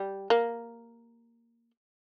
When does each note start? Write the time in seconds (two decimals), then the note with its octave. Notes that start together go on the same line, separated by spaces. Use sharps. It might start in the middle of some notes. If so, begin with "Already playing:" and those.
Already playing: G3
0.30 A#3